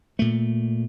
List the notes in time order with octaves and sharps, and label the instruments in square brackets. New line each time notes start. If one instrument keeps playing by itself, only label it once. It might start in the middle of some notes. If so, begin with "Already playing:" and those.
[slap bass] A#2 A3